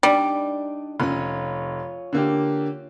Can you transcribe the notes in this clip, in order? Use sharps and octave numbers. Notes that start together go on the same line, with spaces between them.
G3 D4 D#4 D5
F1 C#4 F4 C#5
D3 A#3 G4